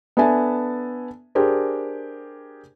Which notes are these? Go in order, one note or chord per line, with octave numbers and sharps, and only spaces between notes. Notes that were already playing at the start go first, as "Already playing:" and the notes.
B3 D4 A4 E5 G#5 A5
D4 G4 G#4 A#4 C5